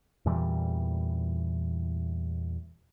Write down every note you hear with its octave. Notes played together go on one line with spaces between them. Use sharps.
E2 A#2 E3 G3